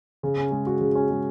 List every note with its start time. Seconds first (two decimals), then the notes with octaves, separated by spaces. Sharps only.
0.23 C#3
0.38 C#4
0.51 G#3
0.67 F#4
0.81 C#3
0.95 C#4
1.10 G#3